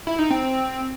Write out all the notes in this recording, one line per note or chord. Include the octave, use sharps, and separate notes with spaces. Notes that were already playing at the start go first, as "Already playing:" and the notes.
E4
D#4
C4